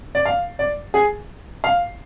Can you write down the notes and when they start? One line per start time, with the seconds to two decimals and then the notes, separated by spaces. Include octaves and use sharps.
0.15 D5
0.26 F5
0.59 D5
0.94 G#4
1.64 F5